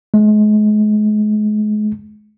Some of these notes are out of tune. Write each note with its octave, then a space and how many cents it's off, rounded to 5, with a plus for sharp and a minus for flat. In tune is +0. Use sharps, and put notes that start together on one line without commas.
G#3 +35